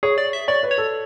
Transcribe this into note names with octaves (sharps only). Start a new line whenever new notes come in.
G#4 C#5
D5
E5
C#5 D5
B4
C#5
A4